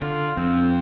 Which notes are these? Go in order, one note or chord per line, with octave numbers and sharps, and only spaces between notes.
D3 F4
F2 C4